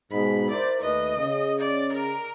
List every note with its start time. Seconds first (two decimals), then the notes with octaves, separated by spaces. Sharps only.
0.11 G#2 B2 B5
0.50 E4 A#4 C5 D5
0.81 D#2 A3 B4 D#5
1.17 C#3
1.59 D5
1.92 A#4